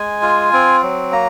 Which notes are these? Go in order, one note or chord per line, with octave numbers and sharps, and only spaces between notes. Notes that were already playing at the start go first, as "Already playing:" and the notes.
Already playing: G#3 G#5
F4
C4
F#3
A#3 A#5